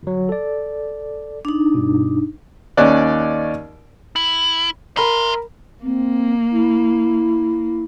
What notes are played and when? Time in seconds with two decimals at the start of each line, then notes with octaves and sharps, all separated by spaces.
0.03 G1 F#3
0.29 A4 D5
1.45 D4 D#4
1.74 G2 B2
2.77 D#2 C#4 D5 F#6
4.16 E4
4.97 A#4 E5 B5 C6
5.83 A#3 C4
6.52 E4